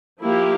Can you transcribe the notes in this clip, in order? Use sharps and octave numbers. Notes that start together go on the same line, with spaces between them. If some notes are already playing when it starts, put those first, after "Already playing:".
F3 A#3 E4 G4